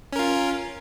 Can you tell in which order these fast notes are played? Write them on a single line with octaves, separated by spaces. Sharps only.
C#4 A#4 F4